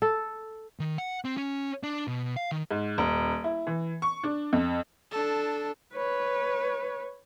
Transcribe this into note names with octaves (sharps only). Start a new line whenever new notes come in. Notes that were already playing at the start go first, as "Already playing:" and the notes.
A4
D#3
F#5
C4
C#4
D4
B2
F5
D#3
G#2
D#1
E4
E3
C#6
D4
F2
D4 A4
B4 C#5